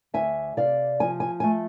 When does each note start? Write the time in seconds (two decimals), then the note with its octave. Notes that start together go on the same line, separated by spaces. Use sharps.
0.14 D2 E5 G#5
0.57 C3 D5 F5
1.00 F3 G#5
1.20 G#5
1.40 A3 G#5